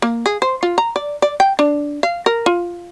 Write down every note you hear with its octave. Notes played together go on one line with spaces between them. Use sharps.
A#3
G#4
C5
F4
A#5
D5
D5
G5
D4
F5
A#4
F4